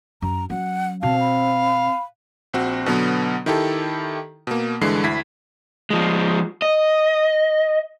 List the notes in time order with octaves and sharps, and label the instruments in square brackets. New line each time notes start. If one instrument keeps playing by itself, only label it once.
[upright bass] F#2 [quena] A#5
[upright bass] F#3 C#4 [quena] F#5
[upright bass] B2 [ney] C4 [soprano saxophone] F5 [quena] A5
[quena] B5
[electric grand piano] A#1 C4 F#4
B2 D3 F#3 B3
D#3 E4 G4 A4
B2 A#3
G2 D3 E3 G#3 C7
D2 E4 G#6 B6
[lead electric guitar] F3 G#3
D#5